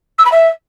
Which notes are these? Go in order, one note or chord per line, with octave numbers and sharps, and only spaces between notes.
E6
B5
E5